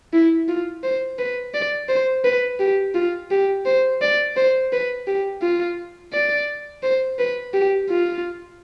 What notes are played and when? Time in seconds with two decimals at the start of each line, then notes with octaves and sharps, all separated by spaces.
0.13 E4
0.48 F4
0.83 C5
1.18 B4
1.54 D5
1.89 C5
2.25 B4
2.60 G4
2.94 F4
3.31 G4
3.66 C5
4.02 D5
4.37 C5
4.72 B4
5.07 G4
5.42 F4
6.13 D5
6.83 C5
7.19 B4
7.54 G4
7.89 F4